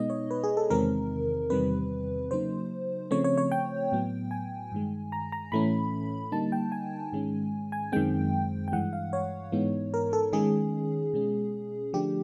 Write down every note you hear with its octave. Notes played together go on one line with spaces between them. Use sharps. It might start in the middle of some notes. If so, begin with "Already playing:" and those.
Already playing: B2 G#3 B3 D#4 D#5
C#5
B4
G#4
A4
E2 C3 D#3 G#3 C4 A#4
E2 C3 D#3 G3 C4 B4
C#3 F#3 A#3 D#4 C5
C#3 F3 A3 C4 C#5
C#5
C#5
G5
A2 F#3 B3
G#5
G2 D#3 G#3
A#5
A#5
A2 E3 A3 C#4 B5
D3 G3 A#3 D#4 A5
G5
G#5
G#2 D#3 G#3 C#4
G#5
F#2 D#3 G#3 C4 G5
G5
G2 E3 G#3 F#5
F5
C#5
G#2 E3 G#3 B3 D#4
A#4
A4
D#3 G#3 C#4 G#4
B2 G#3 C#4
D3 F3 A3 D4 G4